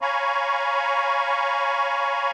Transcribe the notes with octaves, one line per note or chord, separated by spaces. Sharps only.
C#5 F5 G#5 A#5 B5 C#6